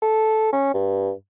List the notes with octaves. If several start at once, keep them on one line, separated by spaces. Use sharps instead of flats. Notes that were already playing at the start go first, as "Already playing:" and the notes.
A4
C#4
G2